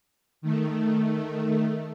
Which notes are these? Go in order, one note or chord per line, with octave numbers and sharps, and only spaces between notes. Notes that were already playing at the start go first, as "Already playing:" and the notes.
D#3 A3